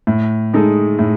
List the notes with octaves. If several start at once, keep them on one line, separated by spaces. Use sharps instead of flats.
A2
G#3 D#4 A4
A2